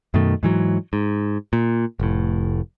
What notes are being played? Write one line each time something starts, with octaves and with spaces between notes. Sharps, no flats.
F#2 B2 D#3 A3
G#2 E3 F#3
G#2
A#2
F1 A2